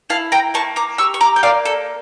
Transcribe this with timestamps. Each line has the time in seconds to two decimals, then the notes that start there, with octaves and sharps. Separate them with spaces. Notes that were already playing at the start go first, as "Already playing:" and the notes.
0.10 E4 F5 A5
0.32 G5 A#5
0.54 A#3 A5 C#6
0.76 A#5 D6
0.98 G4 C#6 E6
1.14 C#6
1.21 A#5 D6
1.36 G5
1.43 A#3 D5 F5
1.65 A4